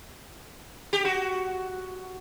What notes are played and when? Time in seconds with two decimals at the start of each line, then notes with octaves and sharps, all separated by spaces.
0.93 G4
1.05 F#4